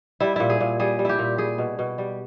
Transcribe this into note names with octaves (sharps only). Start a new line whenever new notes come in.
G3 E4
A#2 E4
G#4
A#2
G3 G#4
G3
E4 G4
A#2
G3 G#4
B2
B2
G3